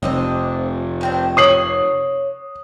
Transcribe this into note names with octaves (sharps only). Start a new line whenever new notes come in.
F1 C4 D4 D#5
D#3 C4 D4
C#5 D#6 C7 F#7